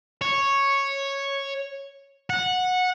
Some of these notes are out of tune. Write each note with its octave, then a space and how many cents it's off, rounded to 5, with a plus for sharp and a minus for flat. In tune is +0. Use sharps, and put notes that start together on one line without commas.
C#5 -5
F#5 -15